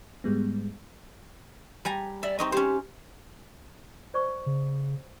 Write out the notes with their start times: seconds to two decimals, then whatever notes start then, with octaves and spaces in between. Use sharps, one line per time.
0.24 G#2 G3 G#3 B3
1.85 G3 G#5 A#5
2.23 D5 E5
2.39 C4 D#4 D#5 C#6
2.52 C#4 G4 C5
4.14 C5 D5 C#6
4.46 C#3